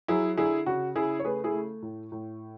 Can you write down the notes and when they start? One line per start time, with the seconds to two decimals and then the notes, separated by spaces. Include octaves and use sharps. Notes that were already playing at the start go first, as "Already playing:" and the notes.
0.08 F#3 E4 G#4
0.37 D3 E4 G#4
0.66 C#3 F#4
0.96 C#3 E4 G#4
1.20 C#5
1.24 A3 G#4 B4
1.44 E4 G#4
1.53 A3
1.82 A2
2.12 A2